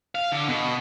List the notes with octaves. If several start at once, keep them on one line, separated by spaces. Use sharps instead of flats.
F5
D3
B2